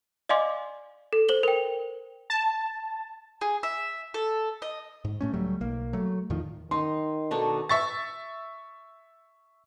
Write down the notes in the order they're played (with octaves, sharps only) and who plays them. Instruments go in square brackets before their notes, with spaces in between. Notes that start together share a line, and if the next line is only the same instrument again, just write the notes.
[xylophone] D5 D#5 F5 G#5 C6 D6
A4
C5 F#7 G7
A#4 G5
[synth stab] A5
[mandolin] G#4
E5
A4
D#5
[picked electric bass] G#2
A2 A3 C#4
C#2 F#3 G3 A3
B1 A#3
F#3 A3
E2 A2 D#3 F3
[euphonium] D#3 [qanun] D#4 [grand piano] C6
[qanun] B2 D4 D#4 [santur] A4 C#6
[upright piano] E5 C#6 A6